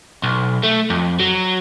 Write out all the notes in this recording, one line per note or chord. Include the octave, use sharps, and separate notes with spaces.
B1
A3
F2
F#3